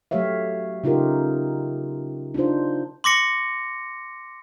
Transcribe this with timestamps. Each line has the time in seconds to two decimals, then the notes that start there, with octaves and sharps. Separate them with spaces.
0.11 F#3 A3 G4 C#5 E5 F5
0.84 C#3 D#4 F4 G4 A#4
2.34 D4 D#4 F4 C5
3.04 C6 D6 A#6 C#7